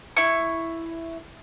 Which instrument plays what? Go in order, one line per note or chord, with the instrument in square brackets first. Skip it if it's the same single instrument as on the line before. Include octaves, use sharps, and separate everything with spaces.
[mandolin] E4 C#6